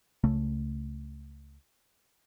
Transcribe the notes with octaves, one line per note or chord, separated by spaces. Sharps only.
C#2 C#3 A3